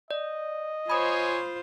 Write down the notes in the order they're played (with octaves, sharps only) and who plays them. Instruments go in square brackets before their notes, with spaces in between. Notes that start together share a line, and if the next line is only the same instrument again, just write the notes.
[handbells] D5 [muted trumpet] D#5
[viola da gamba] F4 C5 [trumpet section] C#5 G#5 [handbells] B5 D#6